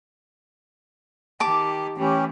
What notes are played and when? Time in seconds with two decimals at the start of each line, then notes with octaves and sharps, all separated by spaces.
1.40 D#3 G4 A5 D6
1.98 E3 A3 C#4 G4